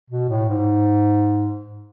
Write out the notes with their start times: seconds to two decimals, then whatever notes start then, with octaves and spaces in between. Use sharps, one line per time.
0.10 B2
0.29 A2
0.48 G#2